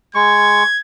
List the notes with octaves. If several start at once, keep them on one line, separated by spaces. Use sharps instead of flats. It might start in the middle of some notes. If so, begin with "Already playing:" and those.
G#3 C#6 G#6